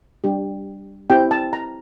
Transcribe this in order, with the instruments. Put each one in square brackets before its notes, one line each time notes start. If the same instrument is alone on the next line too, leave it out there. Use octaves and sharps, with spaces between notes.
[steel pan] G3 D4 G4
C4 E4 G4 G5
A5
A#5